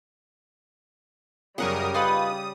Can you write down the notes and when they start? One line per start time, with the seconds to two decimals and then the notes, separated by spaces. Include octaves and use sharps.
1.58 F#2 C#3 G3 A#4 F#5 C#6 D#6
1.94 D#4 F4 B4 D#6